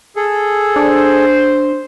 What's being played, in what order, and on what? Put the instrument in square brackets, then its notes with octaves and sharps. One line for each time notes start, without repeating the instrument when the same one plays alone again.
[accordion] G#4 A4
[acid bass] D4 [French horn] C5